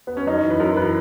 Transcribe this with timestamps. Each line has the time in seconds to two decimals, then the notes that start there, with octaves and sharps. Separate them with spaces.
0.07 B3
0.17 C#4
0.26 F#2 D#4
0.43 E3
0.50 B4
0.60 F#2 A#4
0.76 E3 B4